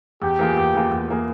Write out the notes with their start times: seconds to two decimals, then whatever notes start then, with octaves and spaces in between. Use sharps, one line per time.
0.22 E2 G4
0.39 E3 A#3 F4 G#4
0.57 E2
0.75 E3 A#3 F4 G#4
0.91 E2
1.09 E3 A#3 F4 G#4